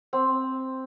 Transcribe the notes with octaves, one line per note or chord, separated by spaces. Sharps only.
C4